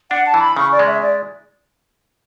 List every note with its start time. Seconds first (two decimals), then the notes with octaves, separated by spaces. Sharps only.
0.11 D4 F#5
0.26 A5
0.34 E3
0.40 B5
0.57 C#3 C#6
0.72 D5
0.79 G#3
0.87 E5
1.02 D5